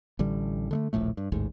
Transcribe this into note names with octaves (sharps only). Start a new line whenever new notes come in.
A1 D3 G3
D3 G#3 A3
D#1 A#1 A2 A3
G2
A1 D#2 G#2